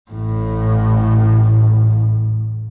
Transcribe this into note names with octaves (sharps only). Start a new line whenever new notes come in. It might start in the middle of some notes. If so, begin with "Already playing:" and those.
A1 A2